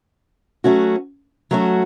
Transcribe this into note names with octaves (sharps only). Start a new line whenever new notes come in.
F#3 A3 C#4 F#4
F#3 A3 C#4 F#4